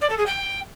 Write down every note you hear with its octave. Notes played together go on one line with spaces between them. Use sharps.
D5
A4
G#4
G5